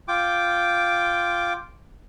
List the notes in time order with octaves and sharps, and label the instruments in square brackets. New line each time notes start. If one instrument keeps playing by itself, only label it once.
[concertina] F4 G5 D6